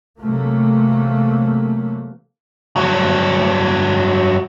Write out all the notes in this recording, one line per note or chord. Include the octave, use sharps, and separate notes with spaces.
C3 E3 F#3 A3 A#3
G2 F#3